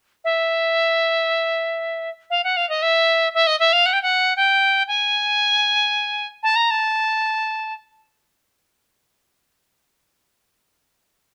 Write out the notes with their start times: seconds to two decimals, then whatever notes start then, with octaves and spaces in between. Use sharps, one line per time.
0.24 E5
2.30 F5
2.44 F#5
2.57 F5
2.69 D#5
2.82 E5
3.34 E5
3.47 D#5
3.59 E5
3.73 F5
3.86 F#5
3.93 G5
4.02 F#5
4.36 G5
4.88 G#5
6.43 A5
6.56 A#5
6.71 A5